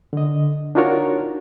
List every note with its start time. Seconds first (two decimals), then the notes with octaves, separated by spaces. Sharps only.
0.13 D3 D#5
0.75 D4 D#4 F4 F#4 A#4 C#5